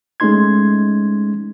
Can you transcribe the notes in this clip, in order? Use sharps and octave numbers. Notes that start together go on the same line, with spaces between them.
G#3 A3 C#4 D#4 C6 G#6